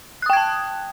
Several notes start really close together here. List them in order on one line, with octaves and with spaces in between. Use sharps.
F#6 D#6 G5 G#6 A5